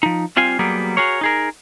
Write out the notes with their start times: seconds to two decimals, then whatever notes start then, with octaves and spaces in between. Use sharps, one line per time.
0.03 F3 D#4
0.37 G3 C4 F4 F5 G#5
0.59 F#3 G3 A#3 B3 G#4
0.97 F#4 G#4 A#4 C#5
1.21 D#4 G#4 A#4